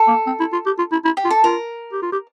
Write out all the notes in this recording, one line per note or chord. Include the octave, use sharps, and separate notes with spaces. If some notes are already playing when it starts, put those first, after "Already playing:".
Already playing: A4
A#3
C4
E4
F4
G4
F4
E4
E4
G4
F4
A4
F4 A#4
G4
F4
G4